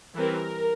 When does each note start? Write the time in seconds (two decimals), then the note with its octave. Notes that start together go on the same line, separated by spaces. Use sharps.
0.16 E3 G3 C4 A#4